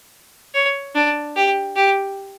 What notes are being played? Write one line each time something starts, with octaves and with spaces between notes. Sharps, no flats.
C#5
D4
G4
G4